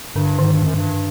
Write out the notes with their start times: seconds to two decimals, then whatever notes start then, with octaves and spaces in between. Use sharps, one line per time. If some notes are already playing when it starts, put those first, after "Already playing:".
0.16 G2 D3
0.39 G#2 D#3
0.51 G2
0.62 F#2
0.74 G2